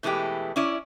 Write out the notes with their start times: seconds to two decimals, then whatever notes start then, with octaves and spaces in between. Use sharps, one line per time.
0.03 B2 E3 G#3 A3 G4
0.56 C#4 E4 D5